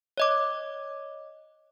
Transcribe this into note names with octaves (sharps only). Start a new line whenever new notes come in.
C#5 D#5 D6